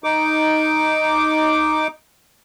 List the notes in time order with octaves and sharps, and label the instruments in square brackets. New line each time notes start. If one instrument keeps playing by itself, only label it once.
[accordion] D#4 D6